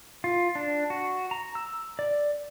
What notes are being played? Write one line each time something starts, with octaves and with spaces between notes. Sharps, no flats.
F4
D4
F#4
A#5
E6
D5